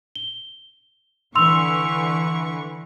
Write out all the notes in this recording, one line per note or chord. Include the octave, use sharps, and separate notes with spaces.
G7
D3 E3 C6 C#6 E6 F7